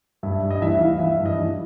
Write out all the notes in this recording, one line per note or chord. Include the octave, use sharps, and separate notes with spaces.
G2 E5
G2
D#5
E3 E5
E5
E3 F5
E3 E5
G2
D#5
E3